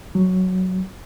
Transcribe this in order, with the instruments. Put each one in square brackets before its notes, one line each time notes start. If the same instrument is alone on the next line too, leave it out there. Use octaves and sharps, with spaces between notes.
[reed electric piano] F#3